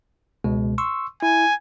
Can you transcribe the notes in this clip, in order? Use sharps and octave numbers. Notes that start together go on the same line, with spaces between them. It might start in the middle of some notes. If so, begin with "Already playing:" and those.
C#2 B2 G#3
C6 C#6 E6
E4 G#5